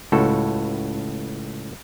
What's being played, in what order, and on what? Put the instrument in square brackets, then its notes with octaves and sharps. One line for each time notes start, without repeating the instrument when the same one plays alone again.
[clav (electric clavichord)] C#2 A2 F#4 A4